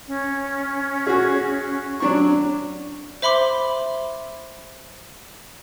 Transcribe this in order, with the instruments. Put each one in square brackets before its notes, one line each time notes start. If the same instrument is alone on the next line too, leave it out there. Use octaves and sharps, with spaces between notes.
[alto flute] C#4
[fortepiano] F#4 G#4
F#3 D4 C#6
[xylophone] C5 E5 B5 C6 D6